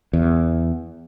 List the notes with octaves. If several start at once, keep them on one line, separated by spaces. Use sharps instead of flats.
E2